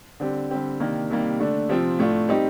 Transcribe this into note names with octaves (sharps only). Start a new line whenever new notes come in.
D3 G3 C4 G4
D3 G3 C4 G4
C3 D#3 A#3 D4 G4
C3 D#3 G3 A#3
D3 A3 D4
C3 F3 C4 F4
A2 A3 D4 F4
G3 C4 D#4 G4